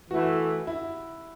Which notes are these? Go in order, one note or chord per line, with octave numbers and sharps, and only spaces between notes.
E3 A3 E4 F#4
E4